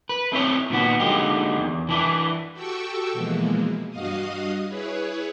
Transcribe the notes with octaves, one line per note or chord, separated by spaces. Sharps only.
B4
A3 C4 E4 C#5
A#2 D#3 B3 F#4
D3 F#3 G#3 A#3 D#4 G4
E2
E3 D4 E4
F#4 G4 A4 G5 C#6 E6
B2 E3 F3 G#3 A#3
G2 F#4 D#5 F5 D#6
E4 G#4 B4 C#5